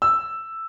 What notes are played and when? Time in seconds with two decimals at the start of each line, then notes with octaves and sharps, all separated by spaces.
0.02 E6